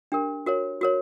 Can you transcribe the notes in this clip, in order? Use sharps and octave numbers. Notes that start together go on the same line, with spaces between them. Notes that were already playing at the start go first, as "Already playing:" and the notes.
D4 G4 A#4
F#4 A#4 C#5
F#4 A#4 C#5